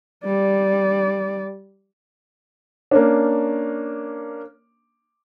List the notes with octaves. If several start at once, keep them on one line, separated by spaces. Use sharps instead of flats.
G3 D5
A#3 C#4 D4